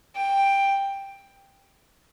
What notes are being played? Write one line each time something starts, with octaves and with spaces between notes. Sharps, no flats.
G5